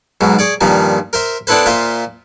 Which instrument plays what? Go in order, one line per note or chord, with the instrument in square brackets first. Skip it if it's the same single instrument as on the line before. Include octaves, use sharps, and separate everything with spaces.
[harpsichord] B1 G#2 B2
G#4 C#5 D5
G2 A#2 D#3 F3
A#4 C5 E5
B3 D4 E4 A4 B4 C5
A#2 F4 C5 E5